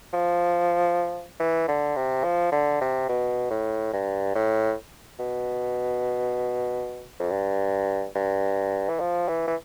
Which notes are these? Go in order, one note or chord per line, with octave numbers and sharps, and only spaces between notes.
F3
E3
D3
C3
F3
D3
C3
B2
A2
G2
A2
B2
F2
G2
G2
E3
F3
E3
E3